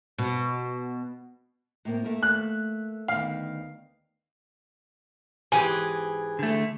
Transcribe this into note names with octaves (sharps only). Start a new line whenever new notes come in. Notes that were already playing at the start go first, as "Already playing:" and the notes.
B2
A2 A#3 C4
A3 A#3 A#4
F#6
D2 D#3 B3 F5
G#2 E3 G4 G#4 G#5
D3 A3